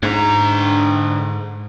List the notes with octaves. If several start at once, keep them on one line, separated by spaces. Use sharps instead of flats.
G#2 D3 A#5